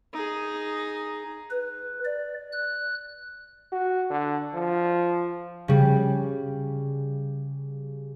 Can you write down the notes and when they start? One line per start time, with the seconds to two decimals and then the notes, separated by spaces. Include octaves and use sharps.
0.13 D#4 G#4
1.51 B4
2.05 D5
2.52 F#6
3.72 F#4
4.11 D3
4.54 F3
5.68 C#3 G3